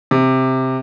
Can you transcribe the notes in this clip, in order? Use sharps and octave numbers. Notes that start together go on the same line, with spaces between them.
C3